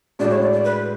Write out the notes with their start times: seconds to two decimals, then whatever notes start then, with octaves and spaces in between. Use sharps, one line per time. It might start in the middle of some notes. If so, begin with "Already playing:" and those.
0.19 A2 G#3 D4 F#4 D5
0.30 C#5
0.42 D5
0.53 D5
0.65 B4